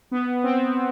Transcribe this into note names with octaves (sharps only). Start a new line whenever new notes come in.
B3
C4